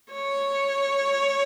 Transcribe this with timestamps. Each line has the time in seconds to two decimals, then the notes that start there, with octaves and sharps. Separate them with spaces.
0.13 C#5